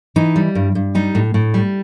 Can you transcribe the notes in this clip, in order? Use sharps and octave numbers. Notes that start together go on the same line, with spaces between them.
E3 D#4
G3
G2
G2
G3 D#4
A2
A2
G3